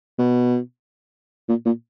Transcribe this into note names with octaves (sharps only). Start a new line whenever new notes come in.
B2
A#2
A#2